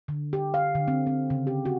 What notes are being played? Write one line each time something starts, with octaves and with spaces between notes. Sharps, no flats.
D3
G4
F5
D3
C4
C4
C#3
G4
F#4